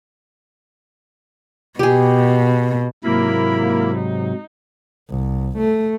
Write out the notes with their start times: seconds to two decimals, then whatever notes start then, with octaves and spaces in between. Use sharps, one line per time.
1.79 B2 G4 G#4
3.04 G#2 C3 F#3 A#3 E4 A#4 B5
3.95 D#4
5.10 C2
5.58 A3